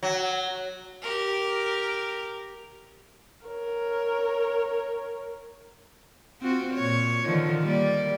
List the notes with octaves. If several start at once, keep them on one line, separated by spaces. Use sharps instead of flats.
F#3
G4 A#4
A#4 C#5
C4 F4 F#4
A#2 C#5
D3 D#3 F3
G3 A#3 D5